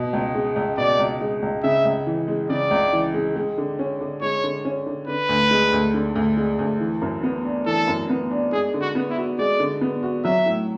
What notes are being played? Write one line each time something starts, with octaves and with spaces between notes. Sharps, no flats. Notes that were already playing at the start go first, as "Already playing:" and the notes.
Already playing: B2
C#2
G#3
C#2
B2 D5
C#2
G#3
C#2
C#3 E5
C#2
E3
G#3
C#3 D5
C#2
E3
G#3
G#3
D3
C#4
D3
G#3 C#5
D3
C#4
D3
D3 B4
D2
G#3
D2
D3
D2
G#3
D2
E3
F#2
B3
D4
E3 A4
F#2
B3
D4
G#3 G#4
D3
F#4
B3
E4
F#4
G#3 D5
D3
B3
F#4
F#3 E5
A2